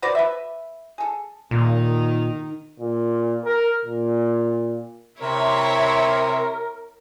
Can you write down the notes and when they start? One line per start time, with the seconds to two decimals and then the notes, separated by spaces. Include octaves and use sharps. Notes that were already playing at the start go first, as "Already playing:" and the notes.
0.02 F#4 B4 C5 D5
0.15 B4 E5
0.98 G#4 A4
1.51 A#2 D#3 D#4
2.80 A#2
3.45 A#4
3.85 A#2
5.22 C3 E4 A#4 C#5 E5